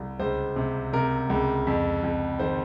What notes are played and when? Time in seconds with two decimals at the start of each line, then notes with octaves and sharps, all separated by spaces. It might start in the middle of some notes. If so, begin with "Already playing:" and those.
Already playing: C2
0.19 C#2 C5
0.56 C3
0.93 C3 A#4
1.30 C#2
1.67 F2
2.03 F2
2.39 D#3 C5